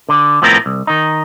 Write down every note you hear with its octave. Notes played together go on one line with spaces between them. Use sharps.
D3
A2 F3 B3 C4 A#4
C2
D#3 D#4